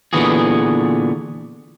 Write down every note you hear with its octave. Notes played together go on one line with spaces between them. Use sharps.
A#2 D3 E3 B3 F#4 G#4